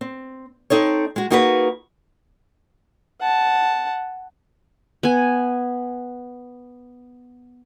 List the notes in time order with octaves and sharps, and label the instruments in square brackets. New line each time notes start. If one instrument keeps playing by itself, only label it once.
[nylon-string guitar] C4
C4 D#4 A4 C#5
G#3 F#4
A#3 D#4 F#4 G#4 A4 B4
[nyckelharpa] F#5 A5
[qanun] B3 G#5